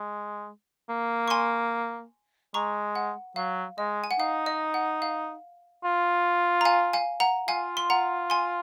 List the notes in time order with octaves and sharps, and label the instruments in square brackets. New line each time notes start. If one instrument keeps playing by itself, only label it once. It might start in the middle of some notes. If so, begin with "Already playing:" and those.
Already playing: [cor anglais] G#3
A#3
[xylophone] C#6
G#5 C6
[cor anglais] G#3 [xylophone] A#5 C#6
[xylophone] F#5
[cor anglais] F#3 [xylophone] F5
[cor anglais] G#3 [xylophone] D#5
[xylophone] G#5
F#5
[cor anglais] D#4 [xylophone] F5
[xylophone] D#5
F#5
F5
[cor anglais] F4
[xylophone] A#5
F5 G#5
F5 G#5
F#5 A#5
[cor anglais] F4 [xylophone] F5 G#5
[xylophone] C6
F#5 A#5
G#5 C6